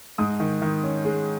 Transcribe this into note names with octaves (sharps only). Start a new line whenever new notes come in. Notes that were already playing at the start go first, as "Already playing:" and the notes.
G#2 D#6
D#3
D#3
C#4
G#3